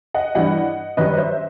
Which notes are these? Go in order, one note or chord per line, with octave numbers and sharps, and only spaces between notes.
D#5 F#5
G2 E3 G3 D#5 F#5
F#2 D#3 G3 B4 D#5
C5 E5